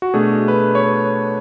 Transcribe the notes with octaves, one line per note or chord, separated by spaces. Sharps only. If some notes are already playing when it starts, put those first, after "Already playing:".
F#4
B2 A3 D4 G#4
B4
C#5
B4